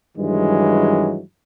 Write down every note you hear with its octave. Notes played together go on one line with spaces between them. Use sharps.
G2 D#3 E3 F#3 G#3